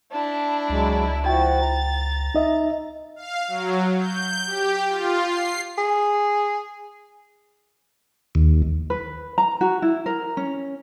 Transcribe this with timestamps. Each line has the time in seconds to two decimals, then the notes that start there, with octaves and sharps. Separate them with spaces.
0.12 D4 E4 A5
0.70 C#2 F#3 G#3
1.26 F3 E4 F#4 G5 A6
1.61 A#5
2.35 D#4 D#5 E5
3.16 F5
3.48 F#3
3.97 G6
4.45 G4
4.88 F4
5.24 C7
5.78 G#4
8.35 D#2
8.90 B4
9.38 A#5
9.61 F#4
9.82 E4
10.06 A#4
10.37 C#4